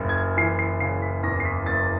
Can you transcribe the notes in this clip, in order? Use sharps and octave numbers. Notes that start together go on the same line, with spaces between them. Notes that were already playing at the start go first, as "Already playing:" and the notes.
Already playing: F#1 F#2 C#3
G#6
E3 C7
C7
C#3 C7
B6
E2 A#6
C7
B6
F#1 A6